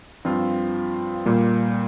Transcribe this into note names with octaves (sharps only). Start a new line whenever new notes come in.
G2 F3 C4 F4
A#2 G3 A#3